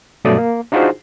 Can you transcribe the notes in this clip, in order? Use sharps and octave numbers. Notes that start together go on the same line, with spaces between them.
G2 B2 F#3 A3 D5 D#6
A#3
D4 D#4 F4 F#4 G#4 C5